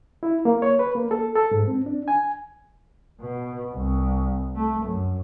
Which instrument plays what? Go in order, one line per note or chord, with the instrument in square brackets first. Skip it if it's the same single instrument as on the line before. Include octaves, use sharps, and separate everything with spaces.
[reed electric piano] E4
A#3
C#5
B4
A#3
A4
A4
G#2
C4
D4
G#5
[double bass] B2
C2
A3
F#2